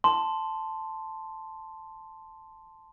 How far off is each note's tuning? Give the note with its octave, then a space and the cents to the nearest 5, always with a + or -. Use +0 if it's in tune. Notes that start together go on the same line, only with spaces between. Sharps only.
A5 +0 C6 +0